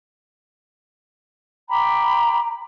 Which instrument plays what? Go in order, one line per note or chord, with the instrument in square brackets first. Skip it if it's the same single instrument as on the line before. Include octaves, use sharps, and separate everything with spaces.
[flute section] G5 B5 D6 [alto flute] A#5